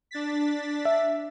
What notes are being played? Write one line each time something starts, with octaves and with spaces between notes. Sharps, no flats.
D4 A6 B6
E5